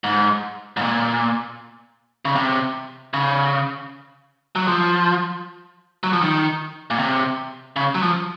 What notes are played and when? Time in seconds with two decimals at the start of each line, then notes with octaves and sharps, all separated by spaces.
0.04 G#2
0.77 G#2
0.82 A#2
2.25 C#3
2.35 C3
3.14 C#3
4.56 F#3
4.68 F3
6.04 F#3
6.13 F3
6.22 D#3
6.90 A#2
6.99 C3
7.76 C#3
7.95 F#3
8.03 F3